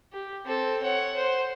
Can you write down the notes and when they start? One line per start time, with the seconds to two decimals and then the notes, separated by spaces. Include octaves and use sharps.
0.12 G4
0.45 C4 A4
0.82 C#5 F#5
1.16 C5